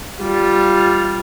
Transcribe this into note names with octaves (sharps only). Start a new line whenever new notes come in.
G3 F4